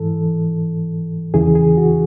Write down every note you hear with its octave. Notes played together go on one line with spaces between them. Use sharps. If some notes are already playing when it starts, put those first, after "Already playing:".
Already playing: G#2 E3 A4
E2 C#3 E3 G#4
G#4
F#4